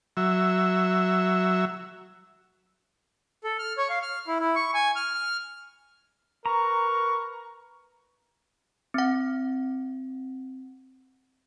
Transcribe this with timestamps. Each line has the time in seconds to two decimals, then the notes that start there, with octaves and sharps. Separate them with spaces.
0.17 F#3 E5
3.44 A4
3.59 F6
3.78 C#5
3.90 F5
4.02 F6
4.28 E4
4.40 E4
4.56 C#6
4.74 G#5
4.96 F6
5.14 F6
6.46 A#4 B4 A#5 C#6
8.94 C4 F#5